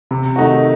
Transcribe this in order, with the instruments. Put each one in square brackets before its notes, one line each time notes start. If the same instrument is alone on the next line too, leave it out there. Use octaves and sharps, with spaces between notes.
[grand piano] C3
D#3 A3 D#4 F#4